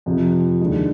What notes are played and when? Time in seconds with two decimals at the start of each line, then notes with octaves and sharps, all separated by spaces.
0.06 F2 C3 F3
0.60 D#2 D3 G#3 D#4